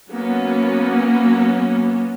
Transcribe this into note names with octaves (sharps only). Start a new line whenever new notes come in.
F#3 A#3 B3 C#4 F#4